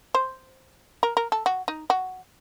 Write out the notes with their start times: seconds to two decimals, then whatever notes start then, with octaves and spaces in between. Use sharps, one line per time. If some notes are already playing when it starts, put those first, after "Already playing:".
0.15 C5
1.03 A#4
1.17 A#4
1.32 A4
1.46 F#4
1.68 D#4
1.90 F#4